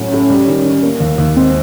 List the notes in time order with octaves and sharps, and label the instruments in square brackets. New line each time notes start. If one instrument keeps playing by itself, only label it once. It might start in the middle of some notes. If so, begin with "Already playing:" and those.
Already playing: [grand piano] A2 F#3 [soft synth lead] C#4
[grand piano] A2
G3
D#3
D#3
A#3
D#2
D#2
[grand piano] G#3 [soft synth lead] C4